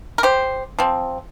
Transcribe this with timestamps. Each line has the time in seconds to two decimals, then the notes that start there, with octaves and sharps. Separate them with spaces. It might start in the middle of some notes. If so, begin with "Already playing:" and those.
0.18 A#4
0.23 G4 C5
0.79 F3 C4